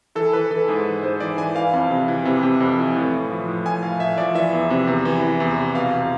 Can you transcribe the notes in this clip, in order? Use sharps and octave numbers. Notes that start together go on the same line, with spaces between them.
E3 A4
E3 B4
E3 A4
G#2 G#4
E3
G#2 C5
E3 D5
E3 G#5
E3 F5
F2
C3
E3
C3
C3
F2
E3
A2
A2
F3
A2
A2 G#5
A2 F5
A2 E5
F3 D5
E3 E5
E2
C3
E2
E3
E3
E2
C3
B2 F5
E2